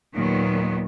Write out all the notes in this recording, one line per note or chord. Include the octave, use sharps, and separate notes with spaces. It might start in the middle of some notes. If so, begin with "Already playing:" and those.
D#2 A#2 D#3 F#3 B3